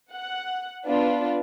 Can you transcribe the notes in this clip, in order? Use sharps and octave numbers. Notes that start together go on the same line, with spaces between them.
F#5
B3 D4 F4 B4